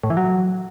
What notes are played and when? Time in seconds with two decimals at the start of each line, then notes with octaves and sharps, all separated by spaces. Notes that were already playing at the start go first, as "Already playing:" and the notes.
0.03 A2
0.10 E3
0.17 F#3